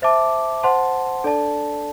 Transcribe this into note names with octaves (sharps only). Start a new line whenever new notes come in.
C5 E5 A5 D6
C5 F#5 A5 C6
D4 A4 D5 A5